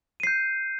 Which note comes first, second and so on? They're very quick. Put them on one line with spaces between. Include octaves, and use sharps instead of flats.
D#7 C7 G6